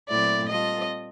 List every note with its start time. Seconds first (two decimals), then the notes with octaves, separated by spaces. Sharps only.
0.08 A#2 F#3 A3 C4 E4 D5
0.48 G3 C4 F4 A4 D#5